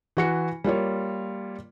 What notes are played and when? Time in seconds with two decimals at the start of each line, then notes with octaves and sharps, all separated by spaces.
0.17 E3 F#4 C#7
0.64 G3 A#3 F4 C#5